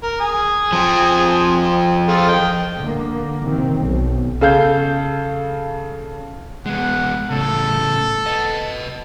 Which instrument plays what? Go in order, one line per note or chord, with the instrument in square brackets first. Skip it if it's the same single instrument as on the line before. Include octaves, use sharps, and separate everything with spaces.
[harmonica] A#4
G#5 D#6
[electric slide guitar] F3 C4
[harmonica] F4 G#4 A4
D#5 G5
[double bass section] D3 A#3
C3 D#3 C4
B1
[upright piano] C#3 A4 F5 G6
[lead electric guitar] G#3 B3 [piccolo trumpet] F#5
[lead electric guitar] A2 C#3 [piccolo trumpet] A4
[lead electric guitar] B4 D#5